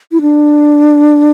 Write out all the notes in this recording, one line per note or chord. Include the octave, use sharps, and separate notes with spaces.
E4
D4